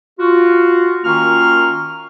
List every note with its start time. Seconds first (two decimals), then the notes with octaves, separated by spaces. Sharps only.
0.19 F4 F#4
1.05 D#3 A#3 C#4 F4 C#6 F6